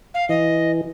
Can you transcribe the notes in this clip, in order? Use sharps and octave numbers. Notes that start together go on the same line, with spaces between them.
F5
E3 D#5